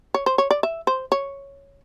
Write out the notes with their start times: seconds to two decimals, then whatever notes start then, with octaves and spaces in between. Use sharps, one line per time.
0.14 C#5
0.26 C5
0.38 C#5
0.51 D5
0.63 E5
0.87 C5
1.12 C#5